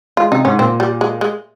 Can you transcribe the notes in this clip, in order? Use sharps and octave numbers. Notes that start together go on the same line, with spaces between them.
G#3 F4
C3 D#4
G#2 C#4
A#2 C4
G3
G#3
G#3